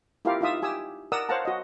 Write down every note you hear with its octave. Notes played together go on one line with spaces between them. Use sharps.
E4 F4 G4 A#4 F5
D#4 F4 E5 D#6
G4 G#5 D#6 E6
A#4 D5 F#5 D#6 E6
C5 C#5 F5 F#5 A5 A#5
F#4 D#5